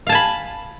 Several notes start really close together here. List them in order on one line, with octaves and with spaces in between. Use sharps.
F5 A5 G#5 B5